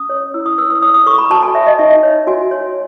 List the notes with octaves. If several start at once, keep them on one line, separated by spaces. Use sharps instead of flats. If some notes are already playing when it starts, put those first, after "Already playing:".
Already playing: C#4 D#6
C#5
E4 E6
D#6
B4 E6
D#6
C#5 D#6
D#6
A4 C#6
B5
F#4 A5
G#5
C#5 E5
D#5
D#4 E5
C#5
F#4 G#5
C#5